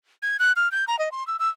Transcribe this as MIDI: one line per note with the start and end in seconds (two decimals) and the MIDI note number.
0.22 0.37 92
0.40 0.52 90
0.56 0.71 89
0.71 0.85 91
0.88 0.98 82
0.99 1.12 75
1.12 1.26 84
1.27 1.37 88
1.39 1.49 88